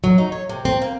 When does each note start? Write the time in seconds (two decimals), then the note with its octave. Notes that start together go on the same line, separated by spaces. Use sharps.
0.04 F#3
0.18 D#4
0.32 C#5
0.49 C3
0.65 C4
0.82 A#3